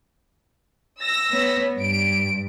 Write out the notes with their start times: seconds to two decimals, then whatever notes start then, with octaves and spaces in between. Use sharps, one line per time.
1.01 E6 A#6
1.32 B3 C#5
1.79 G2 D7